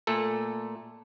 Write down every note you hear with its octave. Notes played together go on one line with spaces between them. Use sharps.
A#2 A3 A4